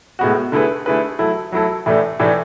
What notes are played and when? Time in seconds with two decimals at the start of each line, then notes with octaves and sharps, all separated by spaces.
0.19 A2 G#3 B3 F#4
0.52 D3 A3 E4 G#4 B4
0.86 D3 A3 E4 G#4 B4
1.19 F#3 A3 E4 A4
1.52 F#3 A3 E4 A4
1.86 A2 E3 A3 D4
2.19 A2 E3 A3 D4